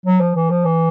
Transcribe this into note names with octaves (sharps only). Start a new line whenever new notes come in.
F#3
F3
E3
F3
E3